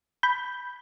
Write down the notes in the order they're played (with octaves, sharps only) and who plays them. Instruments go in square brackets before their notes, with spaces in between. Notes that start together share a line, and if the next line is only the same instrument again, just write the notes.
[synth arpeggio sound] B5 G6